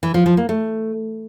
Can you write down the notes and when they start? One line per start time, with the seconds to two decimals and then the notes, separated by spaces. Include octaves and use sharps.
0.03 E3
0.14 F3
0.26 F3
0.37 A#3
0.49 A3